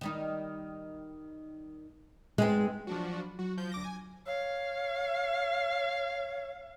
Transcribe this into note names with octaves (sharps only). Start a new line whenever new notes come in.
D#3 G3 D#4
G#2 G#3 B3 C4
F3 F#3 D4 F#4
B5
F#3 F#4
F3 G6
D2 D6 A#6
G#5
C#5 F5